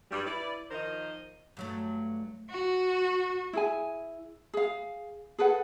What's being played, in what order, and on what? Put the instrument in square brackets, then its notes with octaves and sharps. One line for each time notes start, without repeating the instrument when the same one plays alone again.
[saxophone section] G2 G3
E4 B4 D5
D#3 F3 A#4 C5 D#5
[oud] G2 F#3 A3
[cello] F#4
[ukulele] E4 G#4 G#5
G#4 F5
G#4 A4 B4 F#5